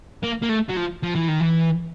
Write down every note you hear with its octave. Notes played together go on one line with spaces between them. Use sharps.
A#3
A#3
A3
F#3
F3
F3
E3
D#3
E3